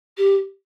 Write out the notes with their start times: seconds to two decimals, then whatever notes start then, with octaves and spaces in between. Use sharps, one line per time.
0.17 G4